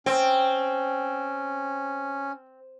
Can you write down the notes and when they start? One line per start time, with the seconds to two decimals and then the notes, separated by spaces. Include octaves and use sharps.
0.06 C4 C#4 G5